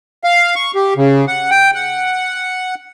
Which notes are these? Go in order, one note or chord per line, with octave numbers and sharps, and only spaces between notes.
F5
C#6
G4
C#3
F#5
G5
F#5